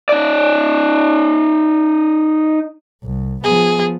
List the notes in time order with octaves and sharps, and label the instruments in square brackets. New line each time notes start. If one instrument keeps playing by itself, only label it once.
[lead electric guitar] D#4 D5
[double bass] C2
[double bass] F3 B3 [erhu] G#4